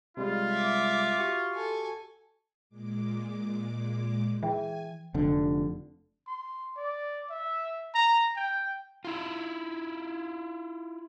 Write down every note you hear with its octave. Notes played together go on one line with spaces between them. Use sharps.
C3 G3 G#3 F4
E5 D6
F#4 G4 C#6
A4 G#5
A#2 G#3 D6
E3 G#4 E5 G5 G#5
F1 D3
C6
D5
E5
A#5
G5
E4 F4